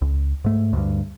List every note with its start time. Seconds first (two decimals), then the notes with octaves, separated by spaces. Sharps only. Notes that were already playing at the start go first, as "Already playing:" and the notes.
0.02 C#2
0.44 G#2 A3
0.73 D2 G2